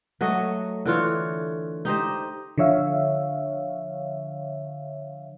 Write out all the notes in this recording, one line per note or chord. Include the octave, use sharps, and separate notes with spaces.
F#3 A3 F#4 D#5
D3 E3 F4 C#5
D#4 G4 C5 D#5
D3 F3 C#5 E5 F5